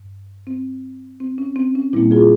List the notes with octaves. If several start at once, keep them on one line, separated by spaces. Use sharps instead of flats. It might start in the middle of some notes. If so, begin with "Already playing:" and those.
Already playing: G2
C4
C4
C#4
C4
C#4
A#2 G3 A#3 C4 E4
F4 G#4